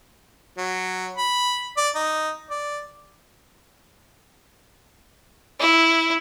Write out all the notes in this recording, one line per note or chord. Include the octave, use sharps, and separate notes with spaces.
F#3
B5
D5
D#4
D5
E4